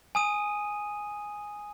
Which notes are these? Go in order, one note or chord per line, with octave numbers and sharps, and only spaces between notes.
G#5 D#6 D#7